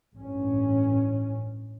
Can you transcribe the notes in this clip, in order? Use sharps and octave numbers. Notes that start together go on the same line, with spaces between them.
A1 G2 C#4